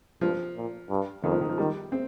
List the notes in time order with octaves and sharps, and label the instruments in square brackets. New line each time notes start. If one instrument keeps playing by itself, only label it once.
[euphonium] G2 [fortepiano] F3
[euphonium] A#2
G2
[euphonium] F2 [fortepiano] D#3
[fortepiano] F3
D#3
F3
[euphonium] D#3 [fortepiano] G3
[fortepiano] C4